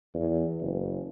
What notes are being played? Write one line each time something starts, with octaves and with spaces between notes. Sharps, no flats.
E2
F#1